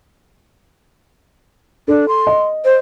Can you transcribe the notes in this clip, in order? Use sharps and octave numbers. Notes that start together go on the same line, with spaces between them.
D4 A4
C6
D#5
C5